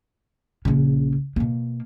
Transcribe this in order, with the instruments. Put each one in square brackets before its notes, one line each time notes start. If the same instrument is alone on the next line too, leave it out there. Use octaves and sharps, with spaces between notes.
[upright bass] A#1 C#3
B2 A#3